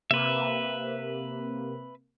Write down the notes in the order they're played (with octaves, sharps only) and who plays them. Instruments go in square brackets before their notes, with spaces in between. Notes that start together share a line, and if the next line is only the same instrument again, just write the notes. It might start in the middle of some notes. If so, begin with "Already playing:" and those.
[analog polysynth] C3 A#3 [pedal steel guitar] B4 E5